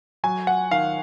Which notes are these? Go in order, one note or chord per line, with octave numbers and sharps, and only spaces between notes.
F#3 G#5
F#5
D#3 F5